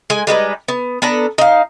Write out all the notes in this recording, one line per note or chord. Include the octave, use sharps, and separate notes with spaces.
G#3 G#5
G3 G#3 D#4 B4
B3
B3 D4 A4 A#5
D#4 F5